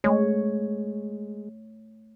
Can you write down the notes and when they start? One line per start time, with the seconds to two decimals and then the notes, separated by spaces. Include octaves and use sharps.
0.04 G#3 A3 C#5